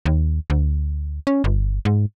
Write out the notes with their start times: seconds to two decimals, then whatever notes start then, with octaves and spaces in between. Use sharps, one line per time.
0.06 D#2
0.50 D2
1.27 C#4
1.44 G1
1.85 G#2